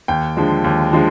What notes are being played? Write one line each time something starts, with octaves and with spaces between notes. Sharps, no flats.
D#2 G5
D3 F3 G#3
D#2
D3 F3 G#3